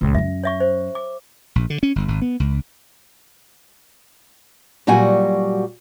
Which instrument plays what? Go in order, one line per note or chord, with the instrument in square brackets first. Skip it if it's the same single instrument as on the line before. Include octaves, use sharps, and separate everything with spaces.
[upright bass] C#2 A#2
[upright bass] F#2 C#4 [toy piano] E5
[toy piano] C#5 E5 C#6
C5
D6
[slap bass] A#1
D3
C#4
G1
G#1
B3
C#2
[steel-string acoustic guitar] A#2 F#3 G3 F#4 F#5 G#5